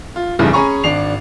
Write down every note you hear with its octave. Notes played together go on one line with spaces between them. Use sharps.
F4
F1 C2 G2 C#3 E3
C#4 G#4 G#5 A#5 B5 C#6
G#1 D4 C7 F7